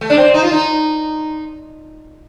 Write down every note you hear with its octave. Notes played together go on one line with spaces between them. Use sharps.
A3
D4
C4
D#4
F4
D#4